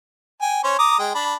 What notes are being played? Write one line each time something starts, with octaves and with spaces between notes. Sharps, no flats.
G5 G#5
C#4 C5 C#5
A#5 D6 D#6
G#3 G5
D4 B5